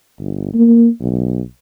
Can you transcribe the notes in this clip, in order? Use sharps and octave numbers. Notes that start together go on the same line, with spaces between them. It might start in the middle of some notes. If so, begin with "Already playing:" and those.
G1
A#3
B1